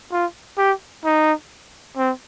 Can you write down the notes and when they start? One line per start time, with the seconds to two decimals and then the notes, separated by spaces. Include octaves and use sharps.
0.12 F4
0.58 G4
1.04 D#4
1.97 C4